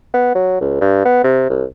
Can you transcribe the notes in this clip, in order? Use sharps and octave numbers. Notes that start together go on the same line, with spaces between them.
B3
F#3
C#2
G2
B3
C3
C2